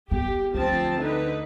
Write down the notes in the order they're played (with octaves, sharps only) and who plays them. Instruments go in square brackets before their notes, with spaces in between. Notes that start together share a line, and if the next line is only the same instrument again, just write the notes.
[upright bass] B3 [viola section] G4
[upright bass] D2 [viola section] F3 C4 A5
[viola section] D3 D#4 B4